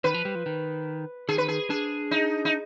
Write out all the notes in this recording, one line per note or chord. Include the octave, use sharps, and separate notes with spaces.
D#3 B4
F3
G3
F3
D#3
D#3 G#4
B4
G#4
D4 G#4
D#4
D#4